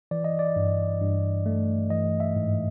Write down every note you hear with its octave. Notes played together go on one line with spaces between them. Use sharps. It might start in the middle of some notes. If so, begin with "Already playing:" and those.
E3 D5
D#5
D5
G2
G2
A3
E3 D#5
E5
G#2